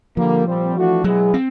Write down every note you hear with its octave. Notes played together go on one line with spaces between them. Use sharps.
D3 F3 G3 A#3
A#2 G3 C4
E3 A3 D4 F#4
B2 F#3 G#3 B3 E4 G#4
C4